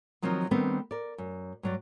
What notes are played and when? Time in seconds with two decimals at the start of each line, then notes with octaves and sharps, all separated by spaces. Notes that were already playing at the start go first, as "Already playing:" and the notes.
0.22 D#3 F3 F#3 C4 D#4 F4
0.51 D#3 G3 A3 B3 C4 D4
0.91 A#4 D5
1.18 F#2
1.63 G2 F#3 D5